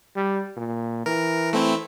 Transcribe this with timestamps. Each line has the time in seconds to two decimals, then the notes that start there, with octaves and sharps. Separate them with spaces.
0.16 G3
0.57 A#2
1.06 E3 A#4
1.53 A3 C4 E4